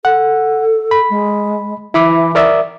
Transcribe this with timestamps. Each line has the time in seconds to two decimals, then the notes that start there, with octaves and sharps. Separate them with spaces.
0.05 A4 F#5
0.91 B5
1.10 G#3
1.94 E3 E4 B5 D6
2.35 A#4 D5 E5